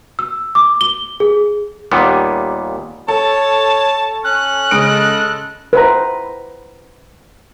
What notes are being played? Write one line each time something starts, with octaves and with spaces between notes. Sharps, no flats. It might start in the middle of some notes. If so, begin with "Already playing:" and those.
E6
D6
G7
G#4
D#2 A#2 G3 B3
A4 C#5 A5
C#4 F#6
C#3 G#3 D#5 D7
A4
B4 C5 A#5